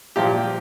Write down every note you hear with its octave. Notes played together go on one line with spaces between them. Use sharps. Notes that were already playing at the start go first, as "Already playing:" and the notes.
A#2 F3 G4